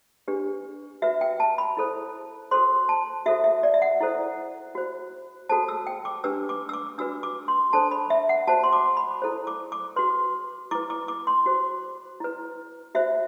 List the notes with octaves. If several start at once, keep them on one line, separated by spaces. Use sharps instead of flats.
D4 G4 B4
F#4 B4 E5
G5
A5
B5
E4 A4 C5
F#4 A4 C5 C6
A5
F#4 A4 C5 E5
E5
D5
E5
F#5
E4 A4 C5
F#4 C5
F#4 A4 C5 A5
E6
G5
D6
D4 G4 B4 E6
D6
E6
D6
D4 F#4 B4 E6
D6
C6
D4 A4 C5 A5
B5
E5
F#5
F#4 C5 A5
C6
D6
B5
E4 A4 C5
D6
D6
F#4 B4 C6
E4 B4 D6
D6
D6
C6
F#4 C5
E4 B4
F#4 C5 E5